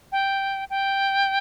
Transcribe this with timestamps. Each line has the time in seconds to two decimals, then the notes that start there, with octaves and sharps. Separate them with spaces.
0.12 G5
0.70 G5